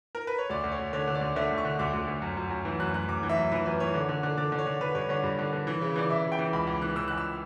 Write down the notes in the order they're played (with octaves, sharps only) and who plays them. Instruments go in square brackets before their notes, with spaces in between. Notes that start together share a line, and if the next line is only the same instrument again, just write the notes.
[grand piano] A#4
B4
C#5
D2 D5
D2
C#5
D2
D3 C#5
D3
D5
D2
D3 E5
D2
C#6
D3
D2 D6
D2
D2
F#2
F#2
F#2
E3
F#2 F#6
F#2 F#6
F#2 D6
E3
E5
F#2
E3 B4
F#2 B4
E3 C#5
D3
D3
D3
D3 D5
D3
C#5
D3
D3 B4
G2 C#5
D3 C#5
G2
D3
D3
E3
C#3
E3 D5
C#3 E5
C#3
G5
E3
C#2 B5
C#2 D6
E3 F#6
E3 E6
C#2 F#6
E6